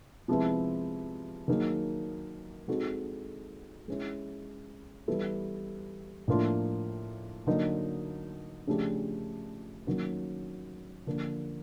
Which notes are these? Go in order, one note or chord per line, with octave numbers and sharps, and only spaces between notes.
C3 F3 G#3 B3 E4
D#3 F#3 A#3 D#4 G#4
G#3 C4 D#4 F#4 A4
G#3 C#4 E4
E3 G3 B3 E4 A4
A2 F3 A#3 D4 F4
D3 F#3 A#3 D#4
C#3 F3 A3 D4 G4
D#3 F#3 A#3 C#4
D3 F3 A#3